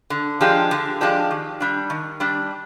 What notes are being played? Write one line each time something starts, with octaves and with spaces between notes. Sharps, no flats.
D3
F3 G#3 D4 G4
D3
F3 G#3 D4 G4
D#3
G3 D4
D#3
G3 D4